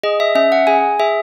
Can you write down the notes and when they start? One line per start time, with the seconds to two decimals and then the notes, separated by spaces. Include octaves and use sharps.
0.03 G#4 D#5
0.20 E5
0.35 C#4 E5
0.52 F#5
0.67 G#4 G#5
1.00 G#4 E5